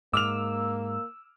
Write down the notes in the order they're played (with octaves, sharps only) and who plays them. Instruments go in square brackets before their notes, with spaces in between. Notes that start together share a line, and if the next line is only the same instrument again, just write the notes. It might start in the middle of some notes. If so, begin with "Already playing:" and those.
[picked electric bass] G#2 [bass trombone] A#3 [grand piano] D6 F6 F7 [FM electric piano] E6